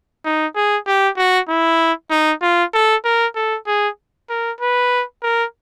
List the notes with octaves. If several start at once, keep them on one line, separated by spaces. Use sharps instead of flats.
D#4
G#4
G4
F#4
E4
D#4
F4
A4
A#4
A4
G#4
A#4
B4
A#4